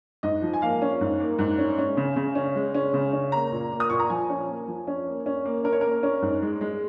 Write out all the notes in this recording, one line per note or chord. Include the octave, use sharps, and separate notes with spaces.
G#2 D#5
F3
G#5
A#3 F5
C#4
G#2
A#3
G#2
C#4
C#4
C#3
C#3
C#4
G#3
C#4
C#3
C#4
A#3 A#5
A#2
A#3
D#6
A#2 C#6
A#5
F3 G#5
C#4
A#3
F3
C#4
A#3
C#4
A#3
C#4 A#4
C#5
A#3 A#4
C#4
G#2
G#3
G#3